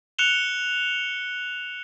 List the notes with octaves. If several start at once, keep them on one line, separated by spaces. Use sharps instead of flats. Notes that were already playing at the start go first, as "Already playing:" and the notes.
F#6 C#7 E7 F7 G7